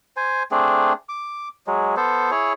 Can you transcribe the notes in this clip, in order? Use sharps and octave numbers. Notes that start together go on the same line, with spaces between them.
C5 G#5
A3 C4 D4 G#4
D6
F#3 G#3
B3 A4 C5
E4 G#4 C#5